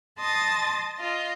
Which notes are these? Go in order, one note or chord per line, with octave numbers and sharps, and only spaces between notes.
D#5 A5 C6 D#6 A6
F4 D#5